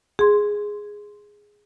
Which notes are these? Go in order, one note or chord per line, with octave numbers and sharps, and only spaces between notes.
G#4 C6